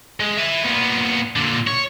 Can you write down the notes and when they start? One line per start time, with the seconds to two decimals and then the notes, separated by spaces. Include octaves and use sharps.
0.20 G#3
0.38 E5 G#5
0.65 A#2 B3
1.36 A#2 D3
1.67 C#5